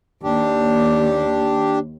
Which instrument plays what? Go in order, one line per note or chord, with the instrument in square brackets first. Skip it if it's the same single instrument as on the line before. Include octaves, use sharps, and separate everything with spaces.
[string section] D#2 [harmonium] D4 G4